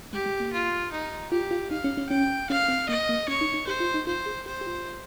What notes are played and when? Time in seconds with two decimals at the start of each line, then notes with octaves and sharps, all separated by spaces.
0.13 G#3 G4
0.26 G#3
0.40 A#3
0.53 F4
0.92 D#4
1.32 F4 G4
1.51 F4
1.71 D#4 F5
1.84 C#4
1.97 C#4
2.09 C#4 G5
2.50 C#4 F5
2.68 C4
2.89 A#3 D#5
3.09 A#3
3.28 C#4 C#5
3.41 D#4
3.54 D#4
3.67 G4 C5
3.80 F4
3.94 D#4
4.07 F4 C5
4.26 G#4
4.46 G4 C5
4.61 G4
4.66 F4